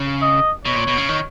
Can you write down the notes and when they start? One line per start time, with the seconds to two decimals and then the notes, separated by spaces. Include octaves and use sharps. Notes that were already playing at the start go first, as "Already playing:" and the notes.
Already playing: C#3
0.22 D#5
0.65 B2 C#5
0.76 A#2
0.87 B2
0.98 C#3
1.09 D#3